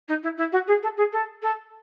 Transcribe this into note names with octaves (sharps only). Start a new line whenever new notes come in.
D#4
E4
E4
F#4
G#4
A4
G#4
A4
A4